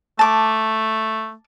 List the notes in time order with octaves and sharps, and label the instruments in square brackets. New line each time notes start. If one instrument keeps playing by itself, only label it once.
[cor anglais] A3 [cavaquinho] A5 D6